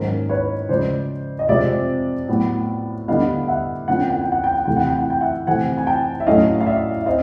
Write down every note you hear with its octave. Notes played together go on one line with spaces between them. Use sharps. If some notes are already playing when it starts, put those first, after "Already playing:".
Already playing: G#2 D#3 F#3 A#3 C#4 A#4 C5
B4 C#5
C#3 F3 G#3 C5 D5
D#5
F2 C3 F3 G#3 C4 D5 E5
A2 F#3 B3
D3 G3 B3 D#5 F5
E5 F#5
F2 D3 F3 A#3 C#4 F#5
G5
F#5
G5
F#5
G5
F#5
C3 E3 A3 G5
F#5
G5
F#5
G5
E5 F#5
C3 E3 A3 C4 F#5 G#5
G#5
G5 A5
E5
A2 F#3 A3 C#4 D#5 F5
F5
D5 E5
E5
C4 D#5 F5